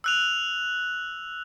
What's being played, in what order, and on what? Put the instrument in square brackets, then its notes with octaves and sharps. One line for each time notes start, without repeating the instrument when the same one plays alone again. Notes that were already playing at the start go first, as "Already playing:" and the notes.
[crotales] E6 F#6 F7